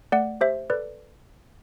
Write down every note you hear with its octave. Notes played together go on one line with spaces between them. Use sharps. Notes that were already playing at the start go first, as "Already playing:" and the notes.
A3 D5 F#5
G4 C5 E5
A4 B4 D5